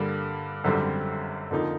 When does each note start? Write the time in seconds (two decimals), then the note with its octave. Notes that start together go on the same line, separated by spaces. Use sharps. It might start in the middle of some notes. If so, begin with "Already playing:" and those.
Already playing: G2 D3 G3 A#3
0.64 G#1 F#2 D3 G3 C4
1.51 F2 D3 F3 A#3 D#4